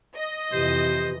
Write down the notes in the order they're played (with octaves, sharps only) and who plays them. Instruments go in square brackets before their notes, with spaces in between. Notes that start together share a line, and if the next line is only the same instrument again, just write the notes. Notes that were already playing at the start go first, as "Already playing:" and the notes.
[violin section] D#5
[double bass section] F2 C3 E3 [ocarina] G4 [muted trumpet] C5